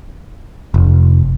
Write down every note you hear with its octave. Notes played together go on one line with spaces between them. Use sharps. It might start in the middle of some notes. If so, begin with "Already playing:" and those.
F1